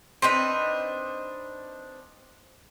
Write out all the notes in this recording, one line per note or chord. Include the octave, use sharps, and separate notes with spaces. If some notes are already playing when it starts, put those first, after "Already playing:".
C4 D4 D#4 B4